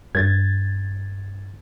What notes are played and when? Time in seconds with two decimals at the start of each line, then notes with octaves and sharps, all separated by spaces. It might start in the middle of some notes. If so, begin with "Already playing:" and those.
0.15 G2 G#6 A6